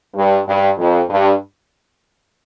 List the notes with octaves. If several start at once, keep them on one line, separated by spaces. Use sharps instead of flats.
G2
G2
F2
G2